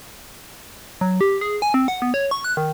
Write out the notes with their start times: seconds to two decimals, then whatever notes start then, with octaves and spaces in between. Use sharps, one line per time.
1.01 F#3
1.21 G4
1.41 G#4
1.62 G#5
1.74 C4
1.88 F#5
2.02 B3
2.14 C#5
2.31 C#6
2.44 F#6
2.57 D#3